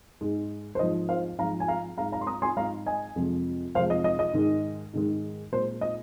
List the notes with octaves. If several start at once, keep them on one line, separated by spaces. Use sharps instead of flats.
G#2 G#3
C5
G#2 F3 G#3 D#5
C5 F5
G#2 F3 G#3 F5 A#5
G#5
F5 A#5
G#2 G#3 F5 A#5
F5 A#5
C6
A#5 D#6
G#5 C6
G#2 G#3 F5 A#5
D#5 G#5
F2 C3 F3 G#3
F2 C3 F3 G#3 C5 F5
D#5
D#5
D#5
G#2 D#3 G#3
G#2 D#3 G#3
A#2 G#3 C5
D#5